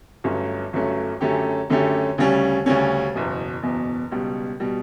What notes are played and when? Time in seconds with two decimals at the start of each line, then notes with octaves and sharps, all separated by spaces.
0.24 G1 G2 F#3 A3 C#4
0.73 G1 G2 F#3 A3 C#4
1.21 F#2 D3 A3 C#4 G4
1.70 F#2 D3 A3 C#4 G4
2.18 D2 C#3 G3 C#4
2.66 D2 C#3 G3 C#4
3.15 F#1 E2 B2
3.63 F#1 E2 B2
4.11 C#2 B2 G3
4.60 B2 G3